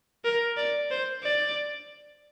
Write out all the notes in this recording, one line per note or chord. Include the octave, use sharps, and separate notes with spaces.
A#4
D5
C5
D5